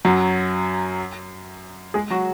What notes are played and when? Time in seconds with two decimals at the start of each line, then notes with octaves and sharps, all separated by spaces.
0.05 F#2 F#3
1.94 G#3 G#4
2.10 F#3 F#4